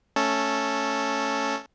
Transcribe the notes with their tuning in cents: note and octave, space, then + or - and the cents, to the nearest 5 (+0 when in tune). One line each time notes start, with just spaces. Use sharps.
A3 +0 C#4 +0 A4 +0